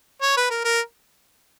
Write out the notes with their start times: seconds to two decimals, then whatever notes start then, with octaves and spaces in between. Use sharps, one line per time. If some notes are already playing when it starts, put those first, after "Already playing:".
0.22 C#5
0.37 B4
0.50 A#4
0.65 A#4